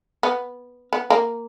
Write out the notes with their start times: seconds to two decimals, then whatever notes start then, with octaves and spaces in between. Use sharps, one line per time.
0.23 B3
0.93 B3
1.10 A#3